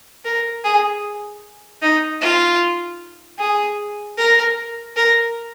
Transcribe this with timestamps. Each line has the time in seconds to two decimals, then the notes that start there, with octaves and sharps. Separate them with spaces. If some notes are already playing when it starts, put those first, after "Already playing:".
0.25 A#4
0.64 G#4
1.82 D#4
2.21 F4
3.39 G#4
4.18 A#4
4.96 A#4